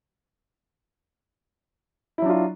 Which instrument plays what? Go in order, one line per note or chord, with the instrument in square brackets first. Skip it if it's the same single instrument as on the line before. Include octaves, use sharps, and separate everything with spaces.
[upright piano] E4
F#3
D4
F4